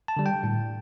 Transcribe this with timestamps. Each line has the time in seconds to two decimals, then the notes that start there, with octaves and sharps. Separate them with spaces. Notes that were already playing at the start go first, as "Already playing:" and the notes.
0.08 A5
0.17 D3 G3
0.26 G5
0.43 A2